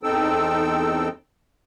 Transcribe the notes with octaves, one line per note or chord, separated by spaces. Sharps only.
E2 C4 D#4 A4 G5 E6